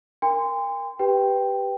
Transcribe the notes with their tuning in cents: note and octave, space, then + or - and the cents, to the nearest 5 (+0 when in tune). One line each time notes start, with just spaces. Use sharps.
A#4 +0 G5 +45 C6 -20
G4 +0 B4 +0 G5 +0